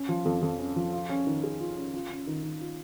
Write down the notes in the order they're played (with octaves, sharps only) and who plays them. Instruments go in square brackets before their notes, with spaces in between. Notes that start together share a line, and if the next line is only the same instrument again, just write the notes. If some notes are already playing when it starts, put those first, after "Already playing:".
Already playing: [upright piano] C#4
F3
F2
F2
C#4
F3
F4
C#4
D#3
G#4
F4
C#4
F4
C#4
D#3
D#3
F4